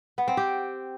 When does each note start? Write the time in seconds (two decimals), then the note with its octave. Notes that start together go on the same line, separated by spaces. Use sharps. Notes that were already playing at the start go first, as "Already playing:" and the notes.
0.18 B3
0.28 C4
0.37 G4